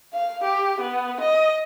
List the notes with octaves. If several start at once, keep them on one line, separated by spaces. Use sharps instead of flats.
F5
G4
B3
D#5